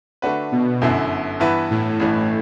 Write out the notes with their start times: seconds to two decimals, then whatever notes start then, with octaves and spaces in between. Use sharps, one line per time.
0.22 D3 A3 D4 F#4 B4
0.52 B2
0.82 G1 F#2 D3 A3 E4
1.40 G2 E3 B3 E4 B4
1.71 A2
2.00 A1 G2 E3 A3